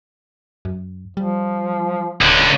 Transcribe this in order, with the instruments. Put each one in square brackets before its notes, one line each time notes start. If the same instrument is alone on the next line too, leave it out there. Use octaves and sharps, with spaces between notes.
[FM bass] F#2
[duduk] F3 [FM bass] G3
[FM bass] D1 [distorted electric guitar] C#2 D3